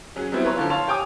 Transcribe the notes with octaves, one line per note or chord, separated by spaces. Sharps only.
F#3 C#4 G#4
F#3 G3 B3 C4 E4
B4 C#5 A#5 C6
D3 F3 F4
C#5 F5 A5 C6 F7
G4 C#5 G5 G#5 D6 D#6